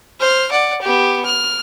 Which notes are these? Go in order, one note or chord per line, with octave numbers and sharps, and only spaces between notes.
C5 F6
D5 F#5
B3 G4
F6